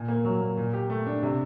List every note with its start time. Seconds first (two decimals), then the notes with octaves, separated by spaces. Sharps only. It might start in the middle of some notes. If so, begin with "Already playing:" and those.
Already playing: A#2
0.08 A#3
0.25 F#3
0.41 A#3
0.57 A#2
0.74 G4
0.90 A3
1.07 D4
1.23 C3